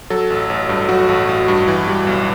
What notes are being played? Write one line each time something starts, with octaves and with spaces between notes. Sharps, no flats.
F#3 A4
A1
A1
G2
F#3 F#4
A1
A1
G2
E3
G3
B1